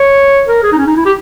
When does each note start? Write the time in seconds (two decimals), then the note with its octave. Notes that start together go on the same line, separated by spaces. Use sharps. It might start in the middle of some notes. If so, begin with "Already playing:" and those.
Already playing: C#5
0.48 A#4
0.63 G#4
0.72 D#4
0.77 C#4
0.86 D#4
0.96 E4
1.05 G4